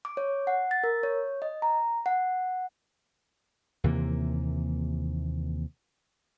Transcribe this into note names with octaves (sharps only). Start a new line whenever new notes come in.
D6
C#5
F#5
A6
A#4
C#5
D#5
A#5
F#5
D#2 C3 E3 A#3